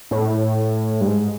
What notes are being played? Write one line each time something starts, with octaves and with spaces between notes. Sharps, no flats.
A2
G2
G#2